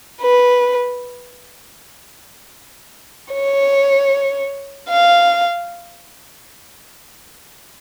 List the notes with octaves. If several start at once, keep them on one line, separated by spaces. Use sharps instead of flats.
B4
C#5
F5